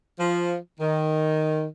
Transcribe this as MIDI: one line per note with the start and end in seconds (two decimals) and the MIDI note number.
0.19 0.56 53
0.80 1.65 51